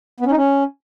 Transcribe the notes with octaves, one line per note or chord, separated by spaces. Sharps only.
B3
C#4
D#4
C#4